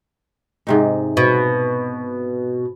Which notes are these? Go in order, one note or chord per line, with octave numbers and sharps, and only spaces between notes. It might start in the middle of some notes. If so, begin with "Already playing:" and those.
G#2 C3 D#4
B2